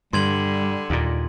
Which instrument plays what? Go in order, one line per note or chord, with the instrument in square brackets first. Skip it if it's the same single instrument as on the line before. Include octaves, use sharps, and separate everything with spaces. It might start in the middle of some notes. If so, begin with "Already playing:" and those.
[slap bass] G2 [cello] D3 [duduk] G3 [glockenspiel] C6 G#6 F#7
[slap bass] D#2 A#2